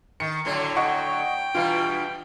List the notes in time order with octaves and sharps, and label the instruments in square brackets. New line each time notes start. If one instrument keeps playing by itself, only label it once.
[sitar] D#3 [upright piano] C#7
[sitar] A2 D3 F#3
[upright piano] D#5 F#5 C#6 [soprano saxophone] G5
[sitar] G2 B2 E3 [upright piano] F4